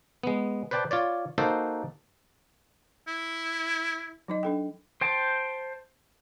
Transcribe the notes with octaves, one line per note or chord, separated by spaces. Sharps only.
G#3 B3
B4 C5 D5 G5 A5
F4 C#5 D5
A#3 D#4 F#4 A4 C5
E4
F#3 D#4 D#5
D4 A4 G5
C5 G5 A5